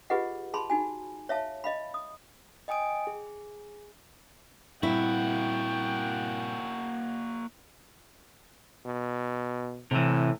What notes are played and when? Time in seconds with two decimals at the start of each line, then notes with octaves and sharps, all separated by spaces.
0.10 F4 G4 G#4 B4 D#5 F#5
0.54 G#4 A5 B5 C6
0.70 D#4 F#4 G#5
1.29 C#5 E5 F5 A5
1.64 D#5 F5 B5
1.94 D#6
2.68 D#5 G5 G#5 D#6 D7
3.07 G#4
4.83 A#2 G3 A#3 C4 E4 F#4 G5
8.85 B2
9.91 A2 C3 E3